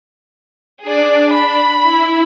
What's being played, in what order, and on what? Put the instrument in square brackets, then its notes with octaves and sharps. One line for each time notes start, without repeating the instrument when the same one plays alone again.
[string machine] D4 [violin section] G#4 D5
[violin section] B5
[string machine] E4